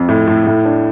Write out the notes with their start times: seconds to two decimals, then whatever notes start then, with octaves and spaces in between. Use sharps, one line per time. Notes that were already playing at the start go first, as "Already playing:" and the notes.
Already playing: F2
0.09 A2
0.27 A2
0.47 A2
0.65 D4